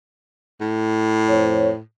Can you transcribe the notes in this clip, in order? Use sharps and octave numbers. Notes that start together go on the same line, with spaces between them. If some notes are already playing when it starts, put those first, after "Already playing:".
A2
F2 C5 C#5